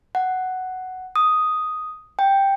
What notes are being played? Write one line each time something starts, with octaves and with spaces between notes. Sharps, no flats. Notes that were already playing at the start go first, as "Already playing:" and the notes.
F#5
D#6
G5